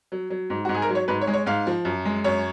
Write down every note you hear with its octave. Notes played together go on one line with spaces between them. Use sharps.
F#3
F#3
G#2
F#4
G#2
G#4
A#4
F#3
C#5
G#2 B4
C#5
G#3
C#5
G#2 F5
F3
F#2
G#3
F#2 C#5